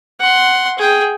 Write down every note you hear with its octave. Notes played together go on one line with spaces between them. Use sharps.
F#5 C6
G#4 G5